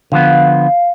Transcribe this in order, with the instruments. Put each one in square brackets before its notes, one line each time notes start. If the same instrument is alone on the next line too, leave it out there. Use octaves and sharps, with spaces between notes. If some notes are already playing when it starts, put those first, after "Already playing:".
[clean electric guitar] D3 F3 B3 [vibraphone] F5